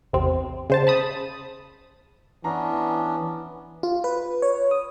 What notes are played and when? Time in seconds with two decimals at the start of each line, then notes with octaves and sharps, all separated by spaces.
0.13 A1 E2 C3 C4
0.70 C#3 C5 A5
0.87 A5 B5 D#6
2.44 E3 B3 C#4 D4 A#5
3.83 F4
4.04 B4
4.42 C#5
4.71 D#6